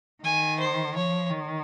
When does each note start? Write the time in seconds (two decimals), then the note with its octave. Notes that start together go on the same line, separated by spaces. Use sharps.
0.24 D#3 G#5
0.59 C5
0.96 F3 C#5
1.30 D#3